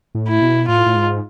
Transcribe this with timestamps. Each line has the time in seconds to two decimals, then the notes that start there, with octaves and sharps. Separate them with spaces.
0.15 A2
0.28 E4
0.42 B2
0.68 A2 F4
0.86 A2
0.96 G#2